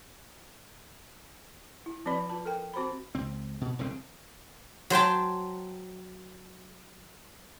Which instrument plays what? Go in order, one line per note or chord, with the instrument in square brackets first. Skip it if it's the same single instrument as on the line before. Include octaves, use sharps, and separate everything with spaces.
[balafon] E4
F3 C4 F#4 B4 D5 B5
F4 B4 A5
A4 A#4 G5
C4 F#4 C5 A#5 B5
[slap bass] C#2 C4
B2
E1 C2 C#3 C4
[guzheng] F#3 C5 G5 A5